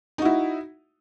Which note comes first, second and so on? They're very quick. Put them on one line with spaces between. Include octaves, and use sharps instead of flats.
D#4 F#4 E4